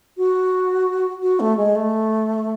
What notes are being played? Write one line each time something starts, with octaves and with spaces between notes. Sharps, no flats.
F#4
F#4
A3
G#3
A3